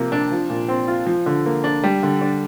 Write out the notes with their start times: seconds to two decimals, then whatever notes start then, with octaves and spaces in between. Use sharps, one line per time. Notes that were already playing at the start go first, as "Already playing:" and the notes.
Already playing: C3 F3 A#3
0.12 D4
0.31 F3
0.50 A#2
0.68 C4
0.88 F4
1.06 F3
1.26 D3
1.46 A#3
1.64 D4
1.83 G3
2.03 D3
2.21 D4